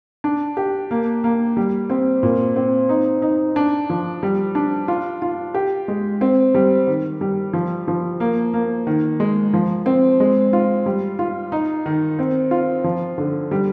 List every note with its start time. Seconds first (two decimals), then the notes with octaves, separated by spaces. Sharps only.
0.24 D4
0.57 G4
0.91 A#3
1.24 A#3
1.57 G3
1.90 C4
2.23 A#2
2.56 C4
2.89 D#4
3.22 D#4
3.56 D4
3.90 F3
4.23 G3
4.55 D4
4.88 F4
5.22 F4
5.54 G4
5.88 G#3
6.21 C4
6.55 G3
6.87 D#3
7.21 G3
7.53 F3
7.88 F3
8.20 A#3
8.54 A#3
8.87 D#3
9.20 G#3
9.54 F3
9.86 C4
10.20 G#3
10.53 F4
10.86 G3
11.19 F4
11.52 D#4
11.86 D#3
12.19 C4
12.51 F4
12.84 F3
13.18 D3
13.51 G3